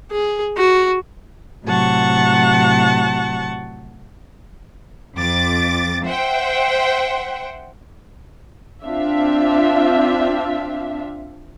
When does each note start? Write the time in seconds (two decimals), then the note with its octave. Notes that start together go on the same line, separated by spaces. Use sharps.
0.11 G#4
0.57 F#4
1.65 A2 C3 F#3 F#5 A5 C#6
5.17 F2 D6 A6
6.05 C5 E5 F#5 G5
8.85 C4 D4 F4 E5 F5